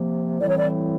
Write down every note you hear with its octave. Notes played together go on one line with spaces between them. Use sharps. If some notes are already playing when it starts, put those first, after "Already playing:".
Already playing: C3 F3 A#3
A2 E3 G3 C4 E4 D5
C#5
D5